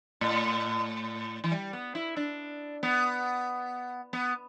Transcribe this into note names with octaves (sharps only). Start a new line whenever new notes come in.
A2
E3
G3
B3
E4
D4
B3
B3